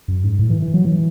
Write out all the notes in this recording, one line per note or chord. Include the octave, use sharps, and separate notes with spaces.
F#2
G#2
A2
E3
E3
F#3
E3